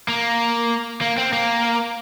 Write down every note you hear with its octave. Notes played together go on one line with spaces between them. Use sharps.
A#3
A#3
C4
A#3